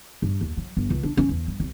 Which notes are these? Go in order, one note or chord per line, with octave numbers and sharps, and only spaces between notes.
G2
D#2
F#3
G1
C#2
D4
C#4
E2
G2
C2